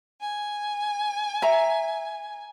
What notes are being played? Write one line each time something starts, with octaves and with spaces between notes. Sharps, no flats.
G#5
E5 A#5